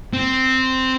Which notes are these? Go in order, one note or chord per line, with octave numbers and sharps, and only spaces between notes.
C4